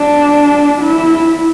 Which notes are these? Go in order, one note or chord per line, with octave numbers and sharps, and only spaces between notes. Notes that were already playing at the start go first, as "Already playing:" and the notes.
Already playing: D4
E4